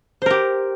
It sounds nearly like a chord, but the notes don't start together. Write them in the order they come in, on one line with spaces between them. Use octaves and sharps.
C5 A#4 G4